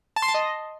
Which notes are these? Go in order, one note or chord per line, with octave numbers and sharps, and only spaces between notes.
A5
C6
A5
D#5